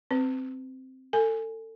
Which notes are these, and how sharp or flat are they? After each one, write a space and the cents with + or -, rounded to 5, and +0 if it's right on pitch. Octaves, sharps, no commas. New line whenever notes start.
C4 +0 B4 +30
A4 +30 G#5 +0